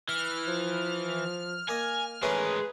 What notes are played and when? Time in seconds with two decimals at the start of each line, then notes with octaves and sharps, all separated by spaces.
0.09 E3 F6
0.48 F3
1.69 A#3 D#5 G#5
2.23 E3 G#3 A3 C#4 G#4 A#4 B4